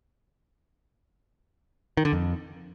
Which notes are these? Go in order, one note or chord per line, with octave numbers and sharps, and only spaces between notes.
D#3
D3
F2